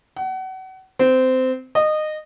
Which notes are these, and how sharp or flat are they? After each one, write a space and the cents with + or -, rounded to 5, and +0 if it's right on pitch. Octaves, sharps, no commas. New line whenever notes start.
F#5 +30
C4 -20
D#5 -20